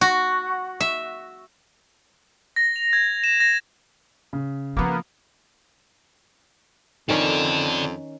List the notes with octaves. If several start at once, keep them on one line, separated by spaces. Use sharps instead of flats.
F#4
E5
A#6
F7
G#6
E7
A#6
C#3
F3 A#3 B3 F4
F2 D#3 C#4 A4 D5